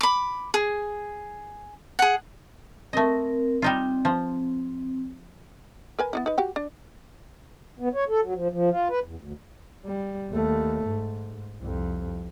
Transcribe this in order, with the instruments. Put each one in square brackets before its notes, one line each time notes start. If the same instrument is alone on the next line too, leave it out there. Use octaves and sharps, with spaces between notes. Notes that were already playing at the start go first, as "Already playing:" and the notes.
[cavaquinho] B5 D6
G#4
G#4 F#5
[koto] A3 D#5 [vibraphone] C4 A#4
[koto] G3 D#4 F4 [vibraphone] C4
[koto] F3
[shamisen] A#4 B4 G#5
B3 D#4 E4
D#4 B4
F#4 G4 G5
D4
[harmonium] B3
C#5
A4
F#3
F3
F3
F4
B4
E2
D2
[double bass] G3
D#2 A3
G#2
C2 F2